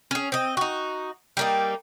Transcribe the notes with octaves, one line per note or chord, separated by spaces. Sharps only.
C#4 G#4
C4 D#5
D#4 F#4
G3 A#3 D#4